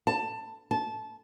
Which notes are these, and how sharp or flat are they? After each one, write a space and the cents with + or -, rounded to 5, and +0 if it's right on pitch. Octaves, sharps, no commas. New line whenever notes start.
A5 +15
A5 -20